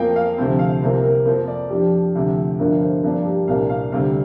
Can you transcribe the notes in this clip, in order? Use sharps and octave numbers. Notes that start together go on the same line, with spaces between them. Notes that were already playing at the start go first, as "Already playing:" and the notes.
Already playing: F2 F3 A#3 G5
F5
D2 C3 F3 C4 C5
F5
C2 C3 A#3 C5
A#4
F2 F3 A#3 C5
D5
F2 F3 D4 G4
D2 C3 F3
G1 G2 D3 F3 A#4
C5
G2 F3 A#3 D4 A#4
G4
C2 A#2 A#3 D4 F5
F5
D2 C3 G3 C4 F5